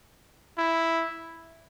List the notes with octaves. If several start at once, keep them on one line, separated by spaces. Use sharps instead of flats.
E4